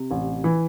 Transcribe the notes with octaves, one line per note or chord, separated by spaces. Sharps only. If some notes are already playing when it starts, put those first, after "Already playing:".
Already playing: C3
A1
E3